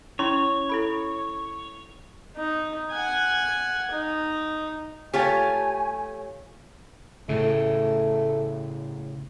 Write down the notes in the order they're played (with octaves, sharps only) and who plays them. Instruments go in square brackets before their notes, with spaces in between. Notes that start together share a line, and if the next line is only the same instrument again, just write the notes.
[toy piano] C#4 E4 C6 [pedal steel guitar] C#5
[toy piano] E4 A4 B5
[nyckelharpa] D#4
F#5 G#5
D#4
[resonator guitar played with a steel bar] A3 F4 G4 [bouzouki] C#5 [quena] G#5
[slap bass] A2 C#3 [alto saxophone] A3